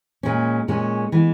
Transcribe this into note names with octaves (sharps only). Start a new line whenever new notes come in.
A#2 G#3 C#4
A#2 G#3 C#4
E3 G#3 B3